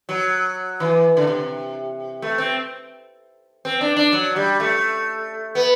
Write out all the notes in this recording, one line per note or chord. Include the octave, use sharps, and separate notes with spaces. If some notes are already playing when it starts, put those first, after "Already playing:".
F#3
E3
D3
C3
A3
C4
C4
D4
D4
F#3
G3
A3
B3